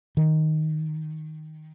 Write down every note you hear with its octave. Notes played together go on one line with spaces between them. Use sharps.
D#3